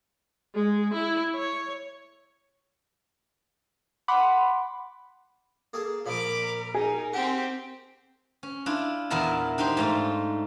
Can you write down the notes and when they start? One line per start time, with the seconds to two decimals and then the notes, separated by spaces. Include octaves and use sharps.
0.55 G#3
0.94 E4
1.36 C#5
4.08 F#5 B5 C6 D6
5.73 A#3 G#4 A4
6.06 A#2 F3 A#4 B5 D6
6.75 D#4 G#4 A#4
7.13 C4 G4 F#5
8.43 C#4
8.66 D4 E4 F4
9.10 E2 A#2 E4 A#4 A5
9.58 D4 D#4 G4 C5 C6
9.77 G#2 A3 F4